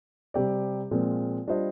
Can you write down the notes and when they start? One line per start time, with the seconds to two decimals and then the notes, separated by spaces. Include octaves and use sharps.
0.34 C3 G3 C4 G4 D5
0.91 A#2 F3 G#3 C4 F4
1.48 G3 D4 F4 C5 D#5